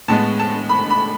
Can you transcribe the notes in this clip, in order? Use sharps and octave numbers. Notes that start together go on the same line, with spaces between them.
A2 G#3 B3 A5
A5
B5
B5